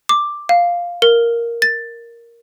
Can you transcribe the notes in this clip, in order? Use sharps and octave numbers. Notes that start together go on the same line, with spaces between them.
D6
F5
A#4
A6